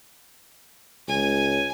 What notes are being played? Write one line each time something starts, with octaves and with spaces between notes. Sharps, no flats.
C#2 G#5